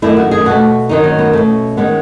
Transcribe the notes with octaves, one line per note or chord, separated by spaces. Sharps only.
F#2 D#3 A3 E4
F#4
G#4
B2 A3 F#4
F#2 D#3 F#3 D#4
C#4
B3
B2 A3 C#4
D#3 G#3 B3